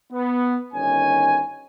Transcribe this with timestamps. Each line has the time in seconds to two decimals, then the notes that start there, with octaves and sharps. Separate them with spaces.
0.12 B3
0.73 G1 D#3 C#4 G#5